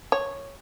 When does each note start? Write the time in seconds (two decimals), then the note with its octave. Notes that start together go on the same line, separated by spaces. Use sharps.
0.12 C#5